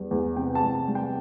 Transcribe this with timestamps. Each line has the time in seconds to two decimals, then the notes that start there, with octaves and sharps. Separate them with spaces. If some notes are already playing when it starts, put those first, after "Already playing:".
Already playing: E2 G3
0.11 E2
0.37 C3 G5
0.55 A5
0.63 E2
0.75 A5
0.88 G3
0.95 G5